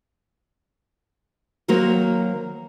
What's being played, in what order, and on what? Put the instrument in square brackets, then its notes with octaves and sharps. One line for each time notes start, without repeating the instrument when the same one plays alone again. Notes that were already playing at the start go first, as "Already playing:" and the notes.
[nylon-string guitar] D#3 F#3 A#3 F#4 A#4 C5